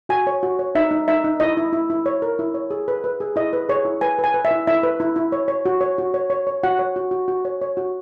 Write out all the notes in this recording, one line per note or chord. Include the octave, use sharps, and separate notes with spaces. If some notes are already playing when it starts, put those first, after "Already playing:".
F#4 G#5
C#5
F#4
C#5
D#4 E5
D#4
D#4 E5
D#4
E4 D#5
E4
E4
E4
C#5
A#4
E4
C#5
G#4
B4
B4
G#4
E4 D#5
B4
G#4 C#5
E4
B4 G#5
B4
G#5
B4
E5
E4
E4 E5
B4
E4
E4
C#5
C#5
F#4
C#5
F#4
C#5
C#5
C#5
F#4 F#5
C#5
F#4
F#4
F#4
C#5
C#5
F#4